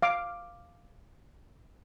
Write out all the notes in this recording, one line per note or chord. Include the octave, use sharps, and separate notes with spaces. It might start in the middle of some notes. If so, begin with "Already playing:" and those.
F5 D6